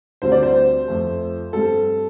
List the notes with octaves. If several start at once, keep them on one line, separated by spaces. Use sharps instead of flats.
D2 D3 G3 C4 C5
D5
C5
F2 F3 A3
G2 G3 C4 A4